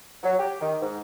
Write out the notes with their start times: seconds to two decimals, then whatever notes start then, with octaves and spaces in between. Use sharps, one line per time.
0.23 F#3
0.39 G4
0.61 D#3
0.81 G#2